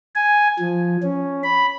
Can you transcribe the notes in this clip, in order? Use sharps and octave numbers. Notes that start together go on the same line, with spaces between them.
G#5
F3
C#4
B5